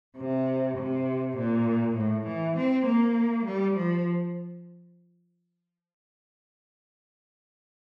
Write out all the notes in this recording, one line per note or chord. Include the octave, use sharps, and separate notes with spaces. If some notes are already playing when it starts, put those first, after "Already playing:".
C3
C3
A#2
A2
E3
C4
A#3
G3
F3